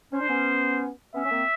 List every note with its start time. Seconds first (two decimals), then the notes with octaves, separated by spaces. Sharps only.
0.13 C#4 C5
0.21 D4
0.28 B3 C#4
1.14 B3 C#4 E5
1.25 C#4
1.31 A#3 C4